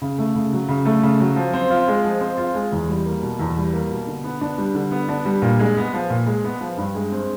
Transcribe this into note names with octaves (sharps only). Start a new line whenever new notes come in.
C#3
A3
C#3
F#3
C#3
A3
C#3
F#3
F3
C4
F4
G#3
F3
C4
F4
G#3
E2
G3
A#3
B2
E2
G3
A#3
B2
D3
B3
D4
G3
D3
B3
D4
G3
A#2
G#3
B3
F3
A#2
G#3
B3
F3
G2
G#3
C4